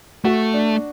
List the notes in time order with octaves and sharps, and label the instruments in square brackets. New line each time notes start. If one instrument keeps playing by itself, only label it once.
[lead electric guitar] A3 [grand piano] F#4
[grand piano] D4